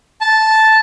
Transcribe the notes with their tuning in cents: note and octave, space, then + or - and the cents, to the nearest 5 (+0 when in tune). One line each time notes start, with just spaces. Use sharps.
A5 -5